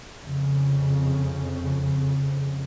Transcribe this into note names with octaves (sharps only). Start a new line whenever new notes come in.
F2 C#3